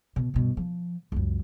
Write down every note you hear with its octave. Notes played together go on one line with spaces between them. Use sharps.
B2
G2 B2
F3
C#2 F#2